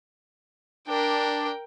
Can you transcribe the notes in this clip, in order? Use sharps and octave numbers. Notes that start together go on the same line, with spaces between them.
D4 A#4 G5